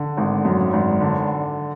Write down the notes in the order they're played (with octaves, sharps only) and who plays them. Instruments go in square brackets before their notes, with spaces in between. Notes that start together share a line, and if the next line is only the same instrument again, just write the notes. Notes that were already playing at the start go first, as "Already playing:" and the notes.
Already playing: [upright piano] D3
G#1
F#2
G#1
D3